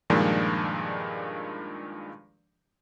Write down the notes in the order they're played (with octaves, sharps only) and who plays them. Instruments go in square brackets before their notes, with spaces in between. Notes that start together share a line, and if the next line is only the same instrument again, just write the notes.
[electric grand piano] G2 A#2 D#3 F3 G#3 D4